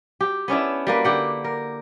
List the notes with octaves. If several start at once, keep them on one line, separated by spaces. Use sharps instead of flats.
G4
B3 C#4 D4 E4
G3 A#3 B4
D3 G4 F#5
A#4